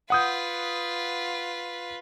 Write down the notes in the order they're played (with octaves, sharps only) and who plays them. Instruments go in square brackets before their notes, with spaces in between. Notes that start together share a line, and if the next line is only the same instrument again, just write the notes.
[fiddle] F4 B4 [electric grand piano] F#5 D#6 G6